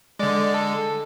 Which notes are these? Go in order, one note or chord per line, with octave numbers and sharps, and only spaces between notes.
D3 G#3 D5
A4